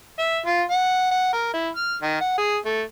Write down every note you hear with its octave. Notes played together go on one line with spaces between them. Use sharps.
E5
F4
F#5
F#5
A#4
E4
F6
D#3
F#5
G#4
A3